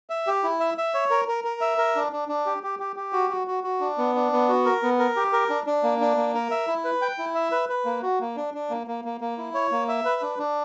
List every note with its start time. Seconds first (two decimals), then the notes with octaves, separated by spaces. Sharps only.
0.10 E5
0.27 G4
0.44 E4
0.60 E5
0.78 E5
0.94 C#5
1.10 A#4
1.28 A#4
1.44 A#4
1.61 E5
1.78 A#4
1.96 D4
2.12 D4
2.29 D4
2.46 G4
2.63 G4
2.79 G4
2.96 G4
3.13 F#4
3.30 F#4
3.47 F#4
3.64 F#4
3.81 D4
3.98 B3
4.15 D4
4.32 B3
4.49 F#4
4.65 A#4
4.83 B3
4.99 A#4
5.16 G4
5.32 A#4
5.50 D4
5.66 D4
5.83 A#3
6.00 D4
6.17 A#3
6.35 A#4
6.51 E5
6.67 E4
6.84 B4
7.02 G5
7.18 E4
7.35 E5
7.52 B4
7.69 B4
7.85 A#3
8.03 F#4
8.20 A#3
8.37 D4
8.54 D4
8.70 A#3
8.87 A#3
9.05 A#3
9.21 A#3
9.38 E4
9.54 C#5
9.71 A#3
9.88 E5
10.05 B4
10.22 D4
10.39 D4